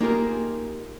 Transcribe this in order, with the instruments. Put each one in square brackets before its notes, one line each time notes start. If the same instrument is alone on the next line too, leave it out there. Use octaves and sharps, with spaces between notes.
[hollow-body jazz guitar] A#3 D#4 F4 G4 G#4 A#4